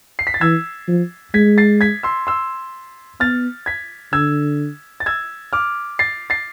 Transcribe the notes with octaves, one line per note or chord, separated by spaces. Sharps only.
C7
B6
A6
E3 E6 G#6
F3
G#3 G#6 B6
A6 C7
G#6 B6
C6 E6
C6 E6
B3 F6 A6
G#6 B6
D3 E6 G#6
A6
E6 G#6
D6 F6
A6 C7
A6 C7